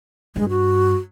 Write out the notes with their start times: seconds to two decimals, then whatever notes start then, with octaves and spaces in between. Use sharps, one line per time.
0.36 G2 G#3
0.49 F#4